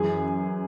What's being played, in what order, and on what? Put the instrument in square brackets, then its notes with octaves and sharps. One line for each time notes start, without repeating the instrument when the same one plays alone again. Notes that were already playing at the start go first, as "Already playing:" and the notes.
Already playing: [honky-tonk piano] F#2 E3 G#4